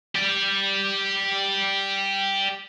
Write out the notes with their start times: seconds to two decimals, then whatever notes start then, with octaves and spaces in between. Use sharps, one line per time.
0.15 G4 D5